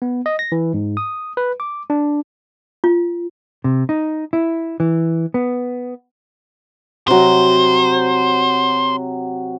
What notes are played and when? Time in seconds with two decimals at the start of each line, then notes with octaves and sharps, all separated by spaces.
0.02 B3
0.26 D#5
0.39 A#6
0.52 E3
0.74 G#2
0.97 D#6
1.37 B4
1.60 D6
1.90 D4
2.84 F4
3.64 C3
3.89 D#4
4.33 E4
4.80 E3
5.34 B3
7.08 C3 F#3 C5